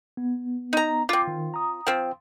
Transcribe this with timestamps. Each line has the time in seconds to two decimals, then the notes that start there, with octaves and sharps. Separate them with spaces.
0.17 B3
0.73 D#4 A#5
1.09 C4 F4 D6
1.27 D#3
1.54 A#5 D#6
1.87 F3 C4 G5